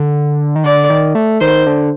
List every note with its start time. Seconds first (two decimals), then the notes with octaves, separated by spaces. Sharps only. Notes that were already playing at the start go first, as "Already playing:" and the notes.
Already playing: D3
0.56 D#3
0.64 D3 D5
0.90 D#3
1.15 A3
1.41 D#3 C5
1.66 D3